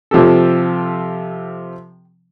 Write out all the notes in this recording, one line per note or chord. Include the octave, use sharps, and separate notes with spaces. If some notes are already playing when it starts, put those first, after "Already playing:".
C3 F3 G4 A4